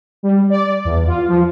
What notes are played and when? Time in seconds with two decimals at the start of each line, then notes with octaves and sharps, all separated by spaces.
0.23 G3
0.50 D5
0.85 E2
1.07 F4
1.28 F3